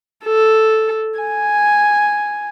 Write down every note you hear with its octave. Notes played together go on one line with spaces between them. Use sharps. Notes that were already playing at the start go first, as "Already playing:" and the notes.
A4
G#5